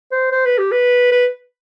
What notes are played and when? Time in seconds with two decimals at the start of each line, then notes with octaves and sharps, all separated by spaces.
0.12 C5
0.32 C5
0.45 B4
0.58 G4
0.71 B4
1.12 B4